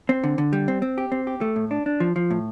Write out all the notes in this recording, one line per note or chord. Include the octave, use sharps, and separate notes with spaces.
C4
D3
D3
G3
C4
C4
G4
C4
G4
A3
A2
D4
D4
F3
F3
A2